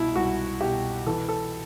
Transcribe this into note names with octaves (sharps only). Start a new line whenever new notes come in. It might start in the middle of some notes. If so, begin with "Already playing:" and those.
Already playing: C2 B2 E4
C2 F#4
B2 G4
E3 A4
A4